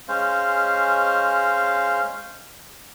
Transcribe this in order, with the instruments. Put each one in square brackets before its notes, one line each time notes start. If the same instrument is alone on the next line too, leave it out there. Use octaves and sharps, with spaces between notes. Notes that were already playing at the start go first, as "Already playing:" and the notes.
[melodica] G#3 C#4 C5 F5